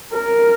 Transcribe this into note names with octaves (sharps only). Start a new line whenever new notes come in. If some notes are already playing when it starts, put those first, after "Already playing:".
A#4